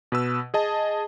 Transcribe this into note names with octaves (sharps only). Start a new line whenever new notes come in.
B2 B4 E6
G#4 D#5 A5